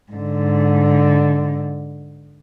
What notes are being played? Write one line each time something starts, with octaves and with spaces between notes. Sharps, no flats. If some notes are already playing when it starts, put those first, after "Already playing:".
G#2 D3